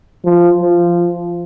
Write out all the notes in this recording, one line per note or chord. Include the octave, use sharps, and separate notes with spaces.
F3
F3